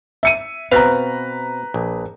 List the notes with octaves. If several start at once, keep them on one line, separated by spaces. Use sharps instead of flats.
E5 C#7 D#7
B2 C4 B4 F5 A#5
A#1